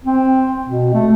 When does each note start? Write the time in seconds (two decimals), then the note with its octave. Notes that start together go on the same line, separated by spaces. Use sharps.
0.04 C4
0.67 B2
0.93 A3